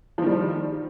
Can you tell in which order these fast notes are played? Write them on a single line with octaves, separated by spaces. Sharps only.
F3 D#3 G3